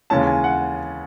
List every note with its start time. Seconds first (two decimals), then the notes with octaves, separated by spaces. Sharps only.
0.10 D#2 C#3 E3 G#3 C#4 A5
0.27 G#5
0.44 F#5